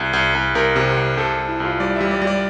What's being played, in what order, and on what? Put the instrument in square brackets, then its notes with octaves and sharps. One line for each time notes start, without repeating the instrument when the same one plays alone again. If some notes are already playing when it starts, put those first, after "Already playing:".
Already playing: [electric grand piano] C2
C2
C2
C2 A#4
C3
C2
C2 A4
C2
E4
C2 F4
G3 D5
G3 E5
D5
G3
D5